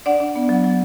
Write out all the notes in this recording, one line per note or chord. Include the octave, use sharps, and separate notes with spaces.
D4 D5 F#5
D4
B3
F#3
F#3